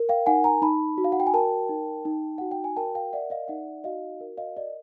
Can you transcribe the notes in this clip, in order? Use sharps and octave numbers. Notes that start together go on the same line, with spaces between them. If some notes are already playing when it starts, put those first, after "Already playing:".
Already playing: A#4
F5 G5
D#4 F#5 G#5
G#5 A#5
D#4 A5 B5
F#4
F5
F#5
G5
G#5
A#4 G5 A5
D#4
D#4
F#4 F#5
G5
G#5
A#4 G5 A5
F5 G5
D5 E5 F#5
D#5 F5
D#4 E5 F#5
F#4 D#5 F5
A#4
D#5 F5
D5 D#5